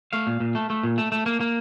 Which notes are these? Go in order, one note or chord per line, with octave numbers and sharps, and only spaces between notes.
A3 F5
A#2
A#2
A3
A3
A#2
A3
A3
A#3
A#3